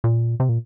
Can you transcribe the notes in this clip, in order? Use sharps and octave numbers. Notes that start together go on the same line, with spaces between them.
A#2
C3
A#2